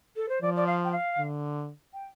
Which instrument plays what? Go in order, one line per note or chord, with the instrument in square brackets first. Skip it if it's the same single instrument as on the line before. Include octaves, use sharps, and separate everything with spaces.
[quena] A4
C5
[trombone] F3 [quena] D5
[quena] D5
F5
G5
F5
[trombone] D3
[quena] G5